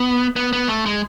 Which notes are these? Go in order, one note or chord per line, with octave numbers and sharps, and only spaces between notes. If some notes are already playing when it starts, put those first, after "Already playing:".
Already playing: B3
B3
B3
A3
G#3